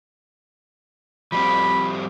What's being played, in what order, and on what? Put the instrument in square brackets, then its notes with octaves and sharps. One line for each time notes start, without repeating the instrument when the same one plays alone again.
[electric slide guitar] F3 G3 C4 [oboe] B5